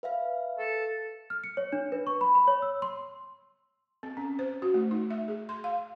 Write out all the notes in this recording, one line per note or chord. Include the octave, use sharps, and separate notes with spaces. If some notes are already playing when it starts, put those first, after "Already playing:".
B4 E5 F5
A4
F6
C#7
C#5
D4
B4
C#6
B5
B5
C#5
E6
C6
C4
C#4
C5
F#4
A3
D#4
E5
G#4
C6
F5